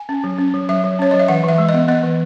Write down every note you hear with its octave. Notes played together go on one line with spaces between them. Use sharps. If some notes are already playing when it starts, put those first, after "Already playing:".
Already playing: G#5
C#4
F#3
C#4
F#3
F#3 E5
F#3
C#4 C#5
F#3 D#5
E5
E3 F#5
E3 E5
G#3
D#5
B3
B3 D#5
E3